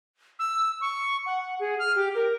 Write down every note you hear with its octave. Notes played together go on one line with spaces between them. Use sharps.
E6
C#6
F#5
G#4
F6
G4
A#4